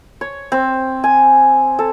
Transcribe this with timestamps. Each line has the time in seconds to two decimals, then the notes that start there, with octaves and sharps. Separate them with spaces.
0.21 C#5
0.52 C4
1.04 G#5
1.79 A4